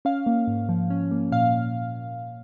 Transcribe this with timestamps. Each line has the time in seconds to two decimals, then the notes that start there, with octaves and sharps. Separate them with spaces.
0.05 C#4 F5
0.26 A#3
0.47 G#2
0.69 F3
0.90 C#4
1.11 A#3
1.32 A#2 F5